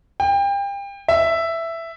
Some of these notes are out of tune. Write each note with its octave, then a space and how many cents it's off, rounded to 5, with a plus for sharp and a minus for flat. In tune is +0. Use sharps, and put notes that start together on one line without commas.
G5 +30
E5 +5